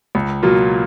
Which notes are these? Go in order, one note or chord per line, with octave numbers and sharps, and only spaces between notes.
C#2
B2 F#3 A#3 F4